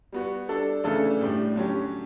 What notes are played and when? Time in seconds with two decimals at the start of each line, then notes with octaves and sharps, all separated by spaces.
0.12 G3 B3 F#4
0.49 G3 D4 A4
0.84 C#3 E3 A3 D4 A4
1.21 A2 G3 D4 G4
1.56 D3 F#3 C#4 G4